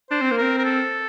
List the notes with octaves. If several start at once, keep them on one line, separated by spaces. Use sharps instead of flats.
D4 C5
C4
A#3
C4 A#4
A#4
A4